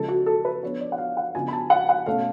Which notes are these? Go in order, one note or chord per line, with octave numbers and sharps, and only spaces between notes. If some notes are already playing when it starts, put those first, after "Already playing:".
Already playing: C#3 F3 G#3 A4
F#4
A4
B4
F3 B3 D4 C#5
D5
F#5
F5
F#5
C#3 F3 B3 D4 G#5
B5
A5
F#5
F#5
B2 A3 C#4 F5